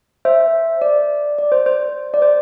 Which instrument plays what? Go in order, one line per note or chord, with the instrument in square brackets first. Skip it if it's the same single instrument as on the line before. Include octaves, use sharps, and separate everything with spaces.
[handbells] C5 E5
D5
D5
C5
C5
D5
C5